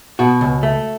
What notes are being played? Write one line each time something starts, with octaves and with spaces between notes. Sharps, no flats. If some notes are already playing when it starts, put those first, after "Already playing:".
B2 F#4
C#2
A3